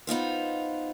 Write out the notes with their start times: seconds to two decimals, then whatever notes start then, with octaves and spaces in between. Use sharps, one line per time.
0.07 B3 D#4 F4 C5